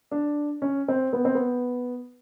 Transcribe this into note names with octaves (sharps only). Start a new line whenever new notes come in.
D4
C#4
C4
B3
C4
B3